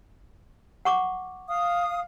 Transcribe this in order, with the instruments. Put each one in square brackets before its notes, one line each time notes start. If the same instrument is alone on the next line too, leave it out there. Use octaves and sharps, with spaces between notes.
[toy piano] F#5 C#6 D6
[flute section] F5 D#6